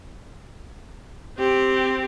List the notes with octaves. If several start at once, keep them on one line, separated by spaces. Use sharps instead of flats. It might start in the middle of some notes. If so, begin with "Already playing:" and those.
C4 G4